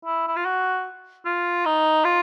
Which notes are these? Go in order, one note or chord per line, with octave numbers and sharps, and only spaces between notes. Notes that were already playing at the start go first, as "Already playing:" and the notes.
E4
E4
F4
F#4
F4
D#4
F4